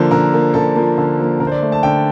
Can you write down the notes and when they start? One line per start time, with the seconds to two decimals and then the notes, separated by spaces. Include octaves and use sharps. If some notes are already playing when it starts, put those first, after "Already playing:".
Already playing: D3 F3 A#3 C5
0.11 D3 A#4
0.33 F3 A#3
0.54 D3 A4
0.76 F3 A#3
0.98 D3
1.19 F3 A#3
1.40 D3 A#4
1.47 C5
1.52 D5
1.63 A3
1.72 A5
1.83 D3 G5